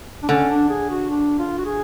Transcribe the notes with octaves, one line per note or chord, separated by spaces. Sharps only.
D4
D3 C#4
D4
G#4
F#4
D4
F4
F#4
G#4